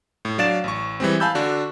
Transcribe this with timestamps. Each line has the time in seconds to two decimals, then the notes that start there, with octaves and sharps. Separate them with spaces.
0.25 A2
0.38 F#3 D4 D5 F5 A6 E7
0.64 A1 C#6
1.00 E3 G3 G#3 C4
1.20 F5 G#5 A5 B5 E6 G6
1.35 D3 D4 F#4